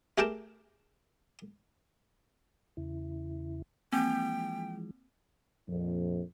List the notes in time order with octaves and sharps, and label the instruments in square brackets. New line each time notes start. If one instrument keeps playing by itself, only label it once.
[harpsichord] A3 G4 G#4 A#4 G5 A5
[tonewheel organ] E2 C#3 E4
[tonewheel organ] E3 F3 G#3 [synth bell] A#3 C4 [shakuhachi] G5
[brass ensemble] A#1 F2